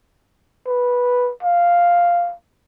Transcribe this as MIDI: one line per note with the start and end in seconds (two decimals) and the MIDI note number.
0.67 1.31 71
1.43 2.34 77